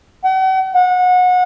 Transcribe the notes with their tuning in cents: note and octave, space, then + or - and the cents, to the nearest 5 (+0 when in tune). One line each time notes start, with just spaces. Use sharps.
F#5 +45
F#5 -25